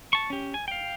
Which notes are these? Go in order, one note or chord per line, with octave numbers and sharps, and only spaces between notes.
A5 C#6
C#4 G4
G#5
F5 G5